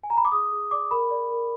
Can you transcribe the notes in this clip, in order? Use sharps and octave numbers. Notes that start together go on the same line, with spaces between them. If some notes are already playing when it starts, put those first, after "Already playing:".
G#5
A#5
B5
D6
G#4 D#6
G#4
D5 D6
A#4 B5
D5
A#4